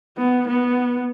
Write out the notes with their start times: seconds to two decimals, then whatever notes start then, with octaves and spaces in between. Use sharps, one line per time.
0.17 B3
0.47 B3